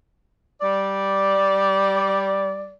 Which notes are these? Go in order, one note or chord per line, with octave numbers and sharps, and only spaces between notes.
G3 D5